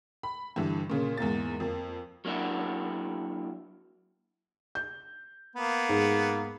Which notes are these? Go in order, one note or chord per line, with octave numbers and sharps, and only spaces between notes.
B5
G2 D3 E3
A#2 C#3 A#3
E2 G#2 A#3 A6
F2 A#3
F#3 A#3 D4 E4 F#4
G6
A#3 B3
G#2